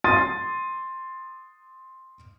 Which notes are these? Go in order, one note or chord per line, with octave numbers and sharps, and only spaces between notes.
C6 D#6 A6 D#7